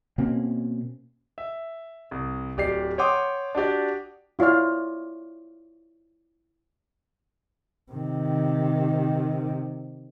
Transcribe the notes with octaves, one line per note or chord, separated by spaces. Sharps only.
B2 A#3 C4 C#4
E5
C2
D1 G4 D5 C7
C#5 F#5 G5 C6 D6 D#6
D4 F#4 G4 D5
E4 F4 C#5 D5 F5
C3 D#3